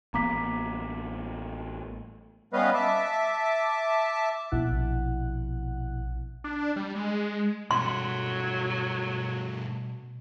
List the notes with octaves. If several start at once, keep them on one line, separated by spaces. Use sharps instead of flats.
A1 A#3 B3 A#5 D6 B6
G3 B3 C#4 B4 D#5 F5
E5 A5 D6
A#1 B2 E4 F#5 F#6
D4
G3
G#3
G2 B2 F#3 A3 C6